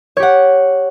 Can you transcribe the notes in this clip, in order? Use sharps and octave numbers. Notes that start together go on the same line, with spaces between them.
G4 C#5 F#5